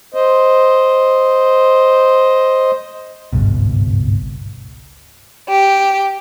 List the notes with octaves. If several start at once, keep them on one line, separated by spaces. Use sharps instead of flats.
C5 D#5
G#1 C#2 G2 B2
G4